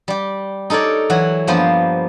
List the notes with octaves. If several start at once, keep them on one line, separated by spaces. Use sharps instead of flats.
G3 G4
D#4 A4 A#4 C#5 D5
E3 F#3 F#4 C#5
G2 F3 A#3 B3 C5